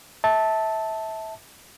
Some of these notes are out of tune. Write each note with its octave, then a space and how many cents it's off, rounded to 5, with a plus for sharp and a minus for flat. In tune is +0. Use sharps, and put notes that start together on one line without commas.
E5 -25 A5 +0